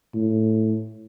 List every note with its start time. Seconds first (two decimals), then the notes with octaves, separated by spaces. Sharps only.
0.15 A2